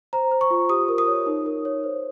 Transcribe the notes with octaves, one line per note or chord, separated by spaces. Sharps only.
C5 A#5
C5
C#6
F4
G4 D#6
A#4
D#6
C#5
D#4
A#4
C#5
C5